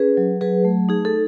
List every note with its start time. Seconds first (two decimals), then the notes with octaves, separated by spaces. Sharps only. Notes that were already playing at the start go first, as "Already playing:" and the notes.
Already playing: C#4 G#4 B4
0.17 F#3
0.41 F#3 G#4 B4
0.65 A3
0.89 D#4 G#4
1.05 A4